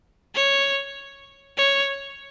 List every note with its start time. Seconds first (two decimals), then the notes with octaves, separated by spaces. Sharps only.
0.35 C#5
1.58 C#5